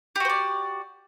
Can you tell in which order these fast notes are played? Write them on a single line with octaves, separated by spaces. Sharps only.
G4 F#4 C5 D5